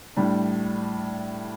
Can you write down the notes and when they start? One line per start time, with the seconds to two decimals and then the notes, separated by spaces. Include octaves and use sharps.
0.17 A2 G3 D4